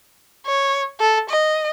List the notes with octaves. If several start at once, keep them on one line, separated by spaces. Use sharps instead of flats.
C#5
A4
D#5